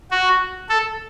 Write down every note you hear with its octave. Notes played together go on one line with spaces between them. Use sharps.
F#4
A4